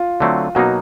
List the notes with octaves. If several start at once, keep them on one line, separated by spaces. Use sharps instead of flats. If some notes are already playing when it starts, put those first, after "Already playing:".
Already playing: F4
D3 F#3 A3 C4
B2 F#3 A#3 D#4 F#4